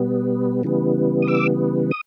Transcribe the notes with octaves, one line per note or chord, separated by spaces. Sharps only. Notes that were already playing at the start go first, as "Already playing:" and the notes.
Already playing: B2 G3 B3
C#3 E3 G3 B3
D#6
D6 E6
D#6